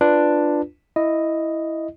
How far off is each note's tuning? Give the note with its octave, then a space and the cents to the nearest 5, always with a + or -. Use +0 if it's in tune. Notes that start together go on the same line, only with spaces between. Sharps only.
D4 +5 F4 -10 B4 +0
E4 +0 D#5 +0